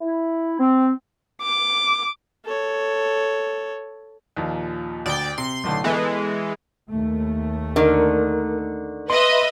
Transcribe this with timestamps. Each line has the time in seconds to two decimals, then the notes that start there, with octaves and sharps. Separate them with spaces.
0.01 E4
0.59 C4
1.42 D6
2.45 A4 C#5
4.36 D#2 A#2 F3
5.06 D2 D5 G5
5.38 C3 C6
5.64 B1 A2 D3
5.84 E3 G#3 B3 A4 B4
6.90 D#2 A3
7.76 D3 D#3 A#4
9.10 B4 D#5 E5 C6